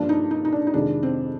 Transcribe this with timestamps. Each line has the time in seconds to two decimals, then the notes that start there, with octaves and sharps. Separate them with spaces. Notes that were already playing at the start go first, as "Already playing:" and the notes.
Already playing: G2 F3 A#3 D4
0.09 D#4
0.31 D#4
0.45 D#4
0.52 D4
0.67 D#4
0.73 F2 C3 D#3 G#3 D4
1.03 C4